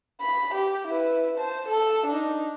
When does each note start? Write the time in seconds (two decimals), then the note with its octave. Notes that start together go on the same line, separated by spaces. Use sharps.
0.21 B5
0.54 G4
0.88 E4 B4
1.38 C5 A5
1.69 A4
2.07 D4 D#4